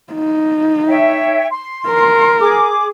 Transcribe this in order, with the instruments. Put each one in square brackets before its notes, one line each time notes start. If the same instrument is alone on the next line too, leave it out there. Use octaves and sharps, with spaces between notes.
[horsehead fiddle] D#4
[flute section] C#5 E5 G5
C6
[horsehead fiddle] A#4
[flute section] G#4 D6